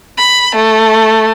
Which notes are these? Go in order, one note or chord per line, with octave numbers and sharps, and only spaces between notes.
B5
A3